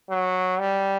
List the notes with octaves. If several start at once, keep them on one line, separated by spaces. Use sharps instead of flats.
F#3
G3